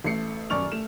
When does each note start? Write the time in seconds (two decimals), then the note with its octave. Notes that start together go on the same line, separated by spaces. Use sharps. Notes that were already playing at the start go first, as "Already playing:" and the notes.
0.04 A1 A3 C7 C#7
0.50 D#1 F#2 D5 C#6 F6 F7
0.72 A3 E7